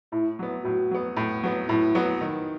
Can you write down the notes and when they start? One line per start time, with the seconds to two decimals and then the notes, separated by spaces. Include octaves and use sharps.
0.12 A2 E4
0.39 F#3 B3
0.64 A2 F#4
0.91 F#3 B3
1.17 A2
1.43 F#3 B3
1.69 A2 E4
1.95 F#3 B3
2.21 D#3